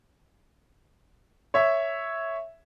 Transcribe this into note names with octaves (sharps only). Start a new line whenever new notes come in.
C#5 E5